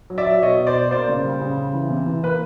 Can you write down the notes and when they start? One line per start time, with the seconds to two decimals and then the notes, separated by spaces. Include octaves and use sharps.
0.10 F#3
0.18 D5 E5
0.26 F#3
0.42 B2 C#5 D#5
0.59 B2
0.67 C5 D5
0.75 B2
0.91 A#3 C5 D5
1.09 C#3
1.25 G3
1.41 C#3
1.57 C#3
1.74 E3
1.90 C3
2.06 E3
2.23 A#3 B4